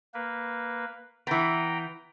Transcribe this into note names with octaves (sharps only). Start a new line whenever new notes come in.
A#3 B4
E3 B3 G5 A#5